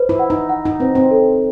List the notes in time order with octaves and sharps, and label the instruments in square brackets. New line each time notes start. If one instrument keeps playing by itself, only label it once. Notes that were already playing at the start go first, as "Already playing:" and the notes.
Already playing: [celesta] B4 C5
[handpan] E4
[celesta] F#5
[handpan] D#4
[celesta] F#5
[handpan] D#4
[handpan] C4 [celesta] B4
[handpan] C4
[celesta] A4